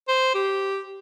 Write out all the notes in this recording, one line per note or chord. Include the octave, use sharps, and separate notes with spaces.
C5
G4